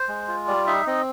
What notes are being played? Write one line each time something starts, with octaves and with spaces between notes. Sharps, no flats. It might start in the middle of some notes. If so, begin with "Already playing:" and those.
Already playing: C5
G#3
F4
G3 D5
D#4 E5
C4 D#5